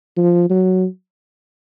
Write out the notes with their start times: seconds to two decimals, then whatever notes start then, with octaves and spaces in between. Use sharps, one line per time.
0.17 F3
0.50 F#3